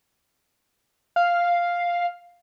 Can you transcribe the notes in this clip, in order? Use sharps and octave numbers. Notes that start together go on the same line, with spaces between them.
F5